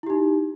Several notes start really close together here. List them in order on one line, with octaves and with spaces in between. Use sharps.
E4 G4 D#4